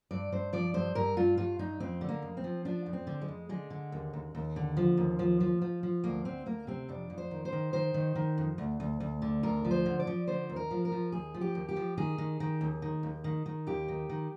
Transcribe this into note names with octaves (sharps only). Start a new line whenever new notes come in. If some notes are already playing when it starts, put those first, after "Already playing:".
G2 D5
G2 C5
F3 D5
G2 C5
G2 A#4
G2 F4
G2 F4
G2 D#4
F2 C4
D3
A#3
F2
C4
F3
F3 D4
F2
C4
D3
G#3
F2
D3 G#3
D3
D#2
D#2
D#2
D3
F3
D#2
F3
F3
F3
F3
D2 A#3
D2 C4
D2 A#3
C3 C4
F2 D4
F2
C5
D#3
C5
D#3
D#3 C5
D#3
D#3
F2
D2
D2
D2
D3
D2 A#4
F3
C5
D3
D5
F3
D3 C5
D#2
A#4
F3
A#4
F3
D#2 G#4
F3
G4
D#2
G4
F3
D#3 G#4
D#3
D#3
D#2
D#3
D#2
D#3
D#3
D#2 G4
D#3
D#3